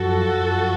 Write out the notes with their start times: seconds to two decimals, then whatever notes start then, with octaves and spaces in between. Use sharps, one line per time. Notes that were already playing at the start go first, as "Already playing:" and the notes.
Already playing: F#2 F3 F#4 A4
0.34 F#2 F3